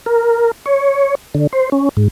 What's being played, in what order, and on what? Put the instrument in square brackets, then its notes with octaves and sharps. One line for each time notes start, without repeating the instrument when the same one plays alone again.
[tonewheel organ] A#4
C#5
D3
C5
C#4
G#2